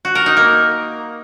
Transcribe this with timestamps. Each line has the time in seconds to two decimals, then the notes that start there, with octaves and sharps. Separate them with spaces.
0.05 F#4
0.15 A#4
0.26 D#4
0.37 A#3